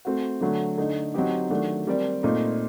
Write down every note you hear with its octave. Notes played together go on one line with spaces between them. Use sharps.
A3 C4 F#4
D3 F#3 A3
D3 A3 D#4
F#3 C4 D#4 G4
D#3 F#3 A3 D4
G3 C4 G4 A#4 D5
A#2 A3 C4 D#4